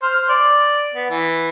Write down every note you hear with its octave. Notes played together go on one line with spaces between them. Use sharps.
C5 F6
D5
B3
E3